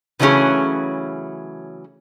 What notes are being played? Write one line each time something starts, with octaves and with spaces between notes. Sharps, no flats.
C#3 E3 F#3 A3 C#4 G#4